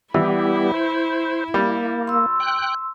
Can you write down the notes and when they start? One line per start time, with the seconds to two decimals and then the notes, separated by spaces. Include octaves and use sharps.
0.14 E3 G3 B3 E4 G4
0.74 C5
1.54 G3 A#3
2.07 C6 E6
2.40 G5 F#6